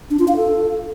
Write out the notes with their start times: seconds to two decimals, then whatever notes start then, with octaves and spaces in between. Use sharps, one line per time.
0.10 D4
0.19 F4
0.28 F5
0.37 A4